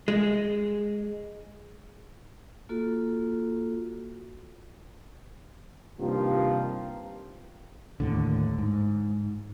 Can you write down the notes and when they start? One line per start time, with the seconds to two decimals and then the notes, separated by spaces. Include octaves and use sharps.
0.08 G#3
2.69 A#3 F4 F#4 A4
6.00 G2 C3 D#3 F3 A#3 F4
8.00 D#2 A2 D3
8.58 G#2